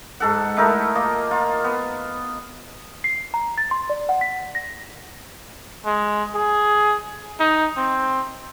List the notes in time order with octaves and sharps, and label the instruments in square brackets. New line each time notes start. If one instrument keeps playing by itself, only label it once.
[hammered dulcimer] G#2 A4 F#5
A3 D#4 E4 A#4
A#3 F4 D#5
F4
B3
[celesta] C7
A#5
A6
C6
D5
F#5
B6
A#6
[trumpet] G#3
G#4
D#4
C4